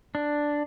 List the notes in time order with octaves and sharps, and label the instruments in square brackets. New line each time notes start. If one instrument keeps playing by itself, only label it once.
[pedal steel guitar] D4